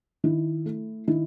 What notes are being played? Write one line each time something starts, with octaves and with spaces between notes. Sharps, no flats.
D#3 E4
A3
D#3 E4